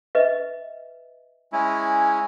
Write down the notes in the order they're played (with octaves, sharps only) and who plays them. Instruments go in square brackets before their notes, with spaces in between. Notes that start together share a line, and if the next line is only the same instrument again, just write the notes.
[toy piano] B4 D#5 E5
[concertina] G#3 C#4 E4